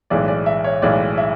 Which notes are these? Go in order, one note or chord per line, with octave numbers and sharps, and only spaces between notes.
B1 A2 E3 G#3 D5
D5
E5
C#5
B1 A2 E3 G#3 D5
E5